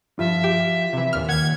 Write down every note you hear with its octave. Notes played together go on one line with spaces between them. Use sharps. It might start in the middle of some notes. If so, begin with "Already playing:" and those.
G2 F3 F4 E5
G4
C3 E3
D#2 A#2 F6
D#2 F#5 G#6